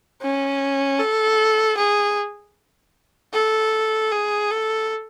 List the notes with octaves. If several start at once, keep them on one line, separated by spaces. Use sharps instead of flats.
C#4
A4
G#4
A4
G#4
A4